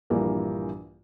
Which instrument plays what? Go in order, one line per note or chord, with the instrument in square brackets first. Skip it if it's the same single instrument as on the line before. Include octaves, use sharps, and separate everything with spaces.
[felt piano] A#1 G2 E3 A#3